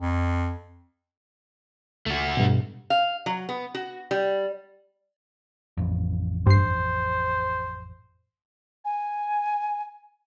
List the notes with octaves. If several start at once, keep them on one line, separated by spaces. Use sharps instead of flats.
F2
C#2 A3 F#4
G2 B2
F5
F#3
B3
F#4
G3
A1 F2
G2 C5 C7
G#5